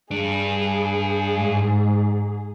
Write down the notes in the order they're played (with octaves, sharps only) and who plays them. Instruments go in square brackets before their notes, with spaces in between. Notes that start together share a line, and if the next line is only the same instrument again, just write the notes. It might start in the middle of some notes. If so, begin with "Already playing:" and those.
[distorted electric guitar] G2 D4 [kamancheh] G#4
[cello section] G#2